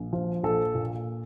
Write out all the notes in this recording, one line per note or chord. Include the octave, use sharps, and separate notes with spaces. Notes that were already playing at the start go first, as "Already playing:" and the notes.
Already playing: A#1
F3
A#1 A4
A#2